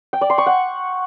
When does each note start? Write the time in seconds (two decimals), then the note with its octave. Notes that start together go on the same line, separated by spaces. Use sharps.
0.13 G5
0.21 D5
0.30 C6
0.38 C#6
0.46 F#5